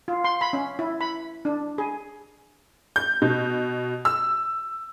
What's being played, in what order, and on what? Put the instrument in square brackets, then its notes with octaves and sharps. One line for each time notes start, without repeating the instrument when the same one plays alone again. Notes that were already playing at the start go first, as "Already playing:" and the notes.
[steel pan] F4
C6
B5
C#4
E4
B5
D4
G#4
[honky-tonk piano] G6
B2
E6